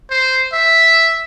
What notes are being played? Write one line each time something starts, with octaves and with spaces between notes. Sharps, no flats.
C5
E5